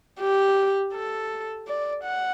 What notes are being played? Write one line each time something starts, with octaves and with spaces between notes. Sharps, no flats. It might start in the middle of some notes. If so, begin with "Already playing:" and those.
G4
A4
D5
F#5